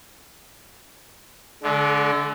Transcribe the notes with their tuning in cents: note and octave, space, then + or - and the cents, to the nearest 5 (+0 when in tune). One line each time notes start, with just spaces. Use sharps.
D3 -10 G#3 +45